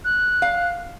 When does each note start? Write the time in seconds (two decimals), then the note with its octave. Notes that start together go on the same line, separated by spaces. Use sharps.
0.04 F#6
0.42 F5